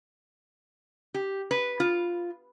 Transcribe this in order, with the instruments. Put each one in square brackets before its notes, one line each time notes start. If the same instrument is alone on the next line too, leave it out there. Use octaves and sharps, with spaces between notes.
[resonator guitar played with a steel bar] G4
B4
F4